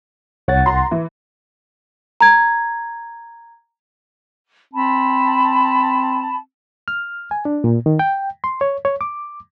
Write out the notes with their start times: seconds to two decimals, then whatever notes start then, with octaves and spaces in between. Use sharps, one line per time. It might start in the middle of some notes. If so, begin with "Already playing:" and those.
0.48 C2 C#5 F#5 A6
0.66 A#5 C6
0.91 E3
2.21 A#5 G#6
4.74 C4 A5 B5
6.88 F6
7.31 G#5
7.45 D4
7.64 A#2
7.86 D#3
7.99 G5
8.44 C6
8.61 C#5
8.85 C#5
9.01 D6